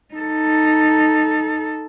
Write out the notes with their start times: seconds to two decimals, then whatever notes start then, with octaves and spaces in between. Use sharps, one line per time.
0.14 D#4 A4